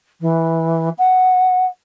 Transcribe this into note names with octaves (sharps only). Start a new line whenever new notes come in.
E3
F#5